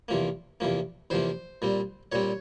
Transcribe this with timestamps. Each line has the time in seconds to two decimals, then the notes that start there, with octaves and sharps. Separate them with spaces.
0.08 E2 C3 F3 A#3
0.60 E2 C3 F3 A#3
1.10 E2 C3 F3 A#3 C5
1.62 A#2 G3 C4
2.12 A#2 G3 C4 C#5